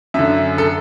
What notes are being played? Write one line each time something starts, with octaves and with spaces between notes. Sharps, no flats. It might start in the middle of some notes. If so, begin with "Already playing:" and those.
F#2 D3 E5
A4